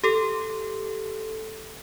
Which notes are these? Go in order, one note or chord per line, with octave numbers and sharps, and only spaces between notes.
G4 A4